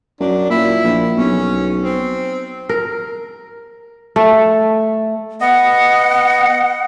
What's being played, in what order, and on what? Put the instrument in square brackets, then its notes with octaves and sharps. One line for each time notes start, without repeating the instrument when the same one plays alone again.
[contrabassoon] F#2 [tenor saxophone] D4
[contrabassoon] A#2 [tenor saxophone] E4
[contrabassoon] A#1
[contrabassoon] B1 [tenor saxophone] C#4
[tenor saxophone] C4
[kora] A#4
A3
[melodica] B3 D#5 [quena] F#5